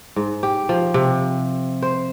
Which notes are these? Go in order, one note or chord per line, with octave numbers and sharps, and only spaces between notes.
G#2
G4
F3
C3
C5